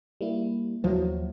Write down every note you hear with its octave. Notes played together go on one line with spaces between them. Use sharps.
G3 A#3 E4
D#2 F3 F#3 E4 F#4